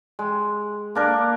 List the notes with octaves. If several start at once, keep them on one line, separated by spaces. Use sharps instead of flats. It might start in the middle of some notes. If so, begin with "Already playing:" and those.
G#3
A#3 D4 A#4